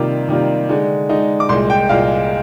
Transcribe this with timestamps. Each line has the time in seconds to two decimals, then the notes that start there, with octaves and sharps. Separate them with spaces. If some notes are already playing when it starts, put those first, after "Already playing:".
Already playing: C3 D#3 G3 A#3 F4 D6
0.29 C3 D#3 G3 A#3 F4
0.69 D3 G#3 D#4
1.09 D3 G#3 D#4
1.40 D6
1.49 C2 A#2 G#3 C6
1.70 G5
1.89 C2 A#2 G#3 F5